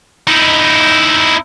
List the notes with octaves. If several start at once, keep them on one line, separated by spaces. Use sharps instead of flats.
D#4 E4